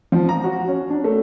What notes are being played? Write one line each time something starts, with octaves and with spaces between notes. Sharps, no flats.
F3
A#5
F#4
C#4
D4
A3